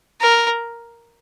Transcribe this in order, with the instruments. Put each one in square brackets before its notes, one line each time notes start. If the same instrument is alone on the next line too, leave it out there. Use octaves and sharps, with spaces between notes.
[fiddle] A#4